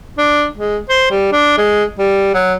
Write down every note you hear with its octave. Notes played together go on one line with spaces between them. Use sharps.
D4
G#3
C5
G3
D4
G#3
G3
F#3